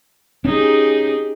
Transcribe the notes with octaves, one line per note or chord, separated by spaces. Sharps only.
C#4 D#4 G4 G#4